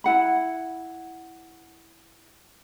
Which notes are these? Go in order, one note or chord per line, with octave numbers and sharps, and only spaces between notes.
E4 F#5 B5